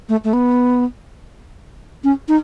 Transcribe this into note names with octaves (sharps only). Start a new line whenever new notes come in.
A3
A3
B3
C#4
D#4